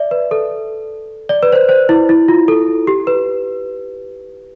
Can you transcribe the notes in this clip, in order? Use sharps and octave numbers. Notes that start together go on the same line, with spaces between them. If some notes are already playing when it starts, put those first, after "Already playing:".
Already playing: D5 E5
B4
A4
D5
B4
C5
B4
C5
E4
E4
F4
A4
G4
B4